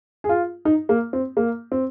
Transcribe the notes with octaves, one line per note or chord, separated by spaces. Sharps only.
G#4
F4
D#4
A#3
C4
A#3
C4